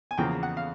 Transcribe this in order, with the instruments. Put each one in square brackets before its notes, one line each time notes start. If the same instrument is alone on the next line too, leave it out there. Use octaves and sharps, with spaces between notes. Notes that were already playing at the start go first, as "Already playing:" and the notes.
[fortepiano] G#5
E2 C#3 F3 A#3 G5
F#5
F5